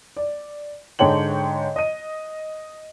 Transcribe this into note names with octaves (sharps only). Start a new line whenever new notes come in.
D5
G#2 D3 C#5 G5 F#7
D#5 D#7